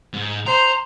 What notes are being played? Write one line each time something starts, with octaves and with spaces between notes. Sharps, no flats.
G#2
C5 A#5